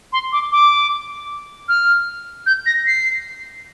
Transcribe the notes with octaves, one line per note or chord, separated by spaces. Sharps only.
C6
D6
D6
F6
G6
A#6
C7